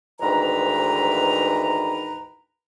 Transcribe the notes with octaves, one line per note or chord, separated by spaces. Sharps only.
D2 G#2 D#3 E3 B4 A#5